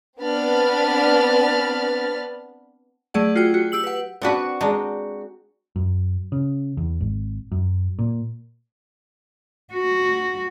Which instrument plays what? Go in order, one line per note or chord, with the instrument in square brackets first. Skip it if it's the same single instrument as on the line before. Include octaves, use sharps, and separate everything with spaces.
[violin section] B3 C4 D4 B5 F6 A6
[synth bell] F#3 A3 G#4 D5 F#5
F4 F#4 G#4 G5
F#4
G4 E6 F#7
B4 F#5
[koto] C4 D4 B4 [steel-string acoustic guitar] F#4 F#5
[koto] G#3 D4 D#4
[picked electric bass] F#2
C#3
E2
G#1
F#2
A#2
[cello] F#4